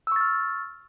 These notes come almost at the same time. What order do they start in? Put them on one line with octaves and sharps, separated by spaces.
E6 C#6 A6 F6